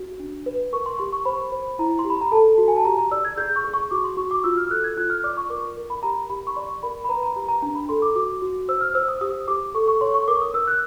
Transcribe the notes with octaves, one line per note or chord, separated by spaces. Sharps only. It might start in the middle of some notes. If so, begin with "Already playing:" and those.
Already playing: F#4
D4
B4
A#4 C#6
C6
G4 C6
C#6
C5 B5
C5
E4 A#5
C6
G4
B5
A#5
A4 A5
F#4
G#5
A5
G4 A#5
A#5
D5 E6
G#6
G#4 G6
C#6
G#4
C#6
F#4 D6
C6
F#4 C#6
D6
F4 E6
F6
A4 F#6
G#6
F4 F#6
F6
D5 D6
C#6
A#4 D6
A#4
B5
G4 A#5
G4 B5
C#6
D5 C6
A#4 B5
B5
B4 A#5
A#5
G4 A#5
A#5
D4 A#5
B5
A4 C6
D6
F#4 D6
F#4
C5 E6
F6
C5 E6
D#6
G4 D#6
G4 D6
A4 C#6
C#6
C#5 C6
C#6
A#4 D6
D#6
A#4 E6
F#6